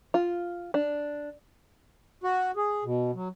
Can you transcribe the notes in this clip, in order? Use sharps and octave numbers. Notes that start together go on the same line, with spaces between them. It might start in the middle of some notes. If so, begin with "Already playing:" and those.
F4
D4
F#4
G#4
B2
F#3